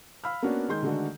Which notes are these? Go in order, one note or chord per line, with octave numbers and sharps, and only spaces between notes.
F5 B5 E6 F6
A#3 B3 C#4 D4 F#4
D#3 G#3 C6 G6
D3 D#3 G#3 A3 D4 F#4